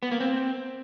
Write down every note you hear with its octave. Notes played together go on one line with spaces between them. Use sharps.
B3
A#3
C4